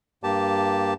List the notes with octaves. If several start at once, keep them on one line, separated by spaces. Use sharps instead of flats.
G2 A#3 G4 A5